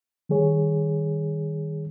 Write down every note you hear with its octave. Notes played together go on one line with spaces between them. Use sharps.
D#3 G3 G#4 C#5